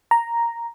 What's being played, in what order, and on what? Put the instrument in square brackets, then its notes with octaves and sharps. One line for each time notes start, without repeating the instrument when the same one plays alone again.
[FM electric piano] A#5